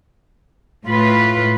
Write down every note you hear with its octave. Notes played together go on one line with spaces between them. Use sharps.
A2 F4 B4